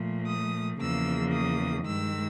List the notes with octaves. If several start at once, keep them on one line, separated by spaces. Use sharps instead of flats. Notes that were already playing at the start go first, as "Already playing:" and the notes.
Already playing: A#2 F3 A3
D#6
E2 C#3 F3 A#3 E6
D#6
G2 D#3 G#3 E6